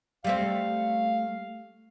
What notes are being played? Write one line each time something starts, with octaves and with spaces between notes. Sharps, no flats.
G3 A3 C4 F5